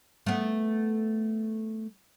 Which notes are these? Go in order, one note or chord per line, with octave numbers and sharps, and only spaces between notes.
A3 B3